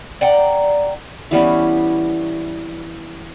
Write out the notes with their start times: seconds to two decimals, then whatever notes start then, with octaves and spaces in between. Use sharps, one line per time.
0.21 D5 F#5 G5 A#5
1.31 E3 G3 B3 C#4